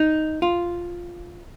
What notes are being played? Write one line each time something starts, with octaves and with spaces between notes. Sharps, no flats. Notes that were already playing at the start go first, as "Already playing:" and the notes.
Already playing: D#4
F4